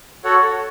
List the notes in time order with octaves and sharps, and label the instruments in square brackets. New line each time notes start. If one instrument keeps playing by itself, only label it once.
[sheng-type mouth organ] F#4 A4 C#5 F#5